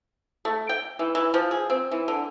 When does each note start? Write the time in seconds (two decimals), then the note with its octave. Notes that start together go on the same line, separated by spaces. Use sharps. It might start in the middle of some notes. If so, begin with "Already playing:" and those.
0.45 A3
0.69 G5
0.99 E3
1.15 E3
1.34 F3
1.51 G#4
1.70 C4
1.91 E3
2.08 D3